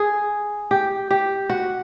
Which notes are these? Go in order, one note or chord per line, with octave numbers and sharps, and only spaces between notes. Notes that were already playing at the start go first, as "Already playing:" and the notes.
Already playing: G#4
G4
G4
F#4